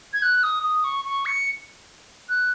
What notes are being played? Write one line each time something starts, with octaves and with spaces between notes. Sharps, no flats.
G#6
F#6
D#6
D#6
C#6
C#6
C#7
F#6